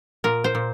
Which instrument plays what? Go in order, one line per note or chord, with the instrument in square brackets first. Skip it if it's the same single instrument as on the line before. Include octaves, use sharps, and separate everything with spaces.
[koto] A#2 A#4
C5
A#2